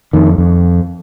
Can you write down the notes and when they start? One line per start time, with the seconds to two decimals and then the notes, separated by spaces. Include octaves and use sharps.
0.13 F2 D#3
0.38 F2